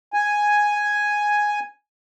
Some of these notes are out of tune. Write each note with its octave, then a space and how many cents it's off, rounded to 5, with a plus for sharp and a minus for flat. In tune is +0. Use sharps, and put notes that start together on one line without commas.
G#5 +0